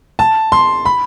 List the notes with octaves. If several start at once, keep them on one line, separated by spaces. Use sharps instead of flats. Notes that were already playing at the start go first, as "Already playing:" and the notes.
A5
C6
B5